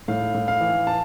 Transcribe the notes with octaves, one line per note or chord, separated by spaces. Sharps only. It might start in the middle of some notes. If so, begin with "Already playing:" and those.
A2 F5
A2
F5
E3
A5